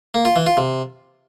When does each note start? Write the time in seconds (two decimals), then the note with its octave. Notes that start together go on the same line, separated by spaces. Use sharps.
0.14 A#3
0.25 F4
0.36 E3
0.46 F4
0.57 C3